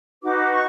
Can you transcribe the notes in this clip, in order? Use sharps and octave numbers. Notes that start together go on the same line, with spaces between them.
D#4 F#4 B4 D6
C#6